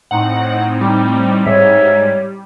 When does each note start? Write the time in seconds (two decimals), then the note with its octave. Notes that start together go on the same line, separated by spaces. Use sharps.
0.11 A2 C4 D#4 F#5
0.81 G3
1.46 G#2 G3 C#5 E5